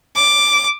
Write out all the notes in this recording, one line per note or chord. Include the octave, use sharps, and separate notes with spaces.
D6